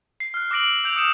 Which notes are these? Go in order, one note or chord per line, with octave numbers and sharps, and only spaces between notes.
C7
F6 F#6
D6 E6 A#6 D7 F#7
E6 G6 D7 F7
D#6 C#7 E7 F7